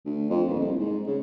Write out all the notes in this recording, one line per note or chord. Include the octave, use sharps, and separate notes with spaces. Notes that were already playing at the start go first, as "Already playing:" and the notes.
D2
F2
D#1
C2
G#2
C#3